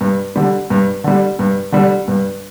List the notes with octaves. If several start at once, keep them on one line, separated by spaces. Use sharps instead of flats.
G2
D3 G3
G2
D3 G3
G2
D3 G3
G2